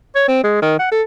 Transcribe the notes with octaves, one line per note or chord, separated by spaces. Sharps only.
C#5
C4
G#3
D#3
F#5
A4